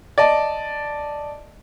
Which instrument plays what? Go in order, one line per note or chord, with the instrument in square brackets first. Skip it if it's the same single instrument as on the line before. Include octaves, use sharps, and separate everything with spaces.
[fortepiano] D5 D#5 A5